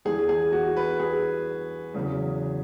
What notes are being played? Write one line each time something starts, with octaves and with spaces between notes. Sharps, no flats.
E2 E3 G#4
G#4
F#4
B4
G#4
E2 C#3 F#3